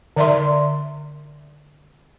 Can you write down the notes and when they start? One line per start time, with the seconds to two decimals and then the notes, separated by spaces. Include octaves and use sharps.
0.16 D3 D5 E5 C6